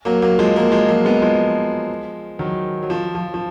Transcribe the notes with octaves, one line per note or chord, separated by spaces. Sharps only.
F#3 A#3
F#3 A#3
F3 G#3
F#3 A#3
F3 G#3
F#3 A#3
G#3 B3
F3 G#3
D#3 F#3
F#3
F3
F3
F3